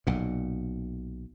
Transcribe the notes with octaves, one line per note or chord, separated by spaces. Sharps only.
B1 A#2